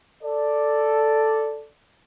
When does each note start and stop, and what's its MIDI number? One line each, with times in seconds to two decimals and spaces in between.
0.22 1.66 69
0.22 1.66 74